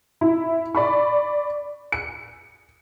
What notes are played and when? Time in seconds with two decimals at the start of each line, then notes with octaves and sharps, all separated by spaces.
0.21 E4
0.75 D5 B5 C#6
1.92 C#7